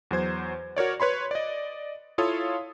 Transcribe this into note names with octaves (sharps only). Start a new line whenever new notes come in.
E2 F#3 C5 G#6
F#4 A#4 C#5 D5
B4 C#5 B5 C6
D5 D#5
E4 F4 A4 C#5 F5 D#6